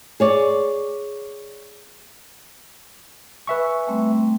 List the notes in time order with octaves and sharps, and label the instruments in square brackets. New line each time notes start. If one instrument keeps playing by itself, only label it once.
[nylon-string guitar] G#4 C#5 D5
[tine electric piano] B4 E5 C#6 [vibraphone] G#5
[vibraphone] G3 A3 C4